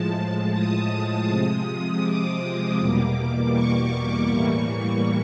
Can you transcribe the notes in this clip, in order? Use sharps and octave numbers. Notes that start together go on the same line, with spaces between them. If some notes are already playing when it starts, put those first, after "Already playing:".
Already playing: A2 F3 G#3 A5
D#6
C3 F3 G#3
D6
E2 B2 G3 A#3
C#6
A2 E3 G3 A#3 C#6